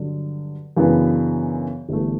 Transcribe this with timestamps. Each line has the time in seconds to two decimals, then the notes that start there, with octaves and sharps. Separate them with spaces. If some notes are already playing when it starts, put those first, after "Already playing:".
Already playing: G2 D3 F#3
0.77 F#2 C#3 E3 B3 D4
1.89 G1 G2 E3 A3